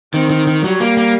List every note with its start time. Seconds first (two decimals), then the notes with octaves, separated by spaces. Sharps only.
0.13 D#3 C4
0.30 D#3
0.47 D#3
0.64 F#3 G3
0.80 A#3
0.97 A#3